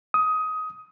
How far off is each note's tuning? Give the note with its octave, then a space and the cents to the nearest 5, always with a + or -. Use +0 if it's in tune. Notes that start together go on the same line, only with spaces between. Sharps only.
D#6 +15